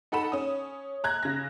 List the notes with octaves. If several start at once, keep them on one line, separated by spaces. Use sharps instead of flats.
D#4 A4 F#5 B5 E7
C#4 D#6
A#5 F#6 G#6
C#3 A#6